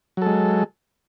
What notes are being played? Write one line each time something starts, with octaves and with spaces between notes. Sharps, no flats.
F#3 G#3 A4